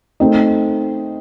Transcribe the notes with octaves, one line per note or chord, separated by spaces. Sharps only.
A3 C4 D#4